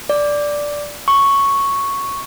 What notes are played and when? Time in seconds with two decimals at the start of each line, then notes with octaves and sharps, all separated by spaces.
0.09 D5
1.08 C#6